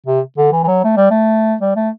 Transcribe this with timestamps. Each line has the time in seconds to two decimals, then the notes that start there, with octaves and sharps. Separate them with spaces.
0.06 C3
0.38 D3
0.52 E3
0.63 E3
0.68 F#3
0.84 A3
0.97 G3
1.10 A3
1.61 G3
1.76 A3